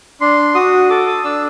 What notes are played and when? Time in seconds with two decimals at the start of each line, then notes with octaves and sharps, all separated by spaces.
0.21 D4 C6
0.55 F#4 D#6
0.90 A4 D6
1.06 D#6
1.24 D4 E6